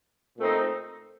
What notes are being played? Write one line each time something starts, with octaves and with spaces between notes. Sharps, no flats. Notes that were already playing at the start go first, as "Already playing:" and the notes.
A#2 A3 C4 D#4